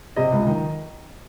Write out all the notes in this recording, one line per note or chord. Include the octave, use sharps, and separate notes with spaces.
C3 D#5
C#2
D#3